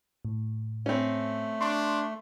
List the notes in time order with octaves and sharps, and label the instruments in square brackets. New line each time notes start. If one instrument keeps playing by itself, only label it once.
[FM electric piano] A2
[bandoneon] A3 [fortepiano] C4 C#4
[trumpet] D4 [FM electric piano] C6 C#6